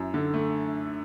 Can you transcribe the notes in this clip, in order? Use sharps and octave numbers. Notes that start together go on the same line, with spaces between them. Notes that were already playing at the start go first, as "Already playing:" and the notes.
Already playing: F#2 E4
D3
A3